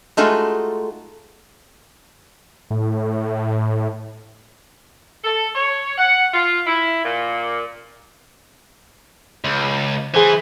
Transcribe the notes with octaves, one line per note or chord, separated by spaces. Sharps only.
G#3 A3 D#4 F4 F#4 A4
A2
A4
C#5
F#5
F4
E4
A#2
C#2
E3 G#4 C5